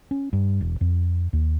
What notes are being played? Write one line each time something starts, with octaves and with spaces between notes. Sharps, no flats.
C#4
G2
E1
F2
D#2